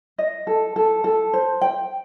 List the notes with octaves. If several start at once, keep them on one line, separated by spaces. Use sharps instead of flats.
D#5
A4
A4
A4
C5
G5